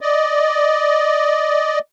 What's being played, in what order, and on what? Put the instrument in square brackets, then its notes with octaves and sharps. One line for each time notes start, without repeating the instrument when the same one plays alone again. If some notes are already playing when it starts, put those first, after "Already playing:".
[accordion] D5 D#5